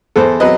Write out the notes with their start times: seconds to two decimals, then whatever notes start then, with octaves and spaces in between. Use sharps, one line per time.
0.16 E2 A4 C5
0.40 F#3 C4 B4 D#5